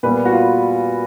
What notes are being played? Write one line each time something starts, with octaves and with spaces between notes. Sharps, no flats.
A#2 G3 B3 B4
F#4
F4